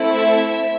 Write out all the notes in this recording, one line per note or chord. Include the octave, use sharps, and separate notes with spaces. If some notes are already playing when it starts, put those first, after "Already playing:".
Already playing: A3 C4 E4 A4
E5